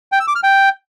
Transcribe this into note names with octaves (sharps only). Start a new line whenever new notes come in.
G5
E6
D6
F6
G5